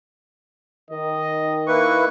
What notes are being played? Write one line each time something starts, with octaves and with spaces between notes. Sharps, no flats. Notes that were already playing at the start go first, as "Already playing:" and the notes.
D#3 D#5
A#3 E4 B4 C#6